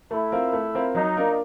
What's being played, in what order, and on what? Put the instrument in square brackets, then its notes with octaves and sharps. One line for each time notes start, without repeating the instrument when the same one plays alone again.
[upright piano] A3 [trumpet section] E4
[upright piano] C4 F4 A#4
A3
C4 F4 A#4
[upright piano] F#3 [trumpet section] D#4
[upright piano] A#3 D4 F4 A#4